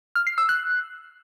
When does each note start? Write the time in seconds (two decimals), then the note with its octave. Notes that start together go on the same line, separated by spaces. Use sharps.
0.15 F6
0.27 C7
0.38 E6
0.49 F#6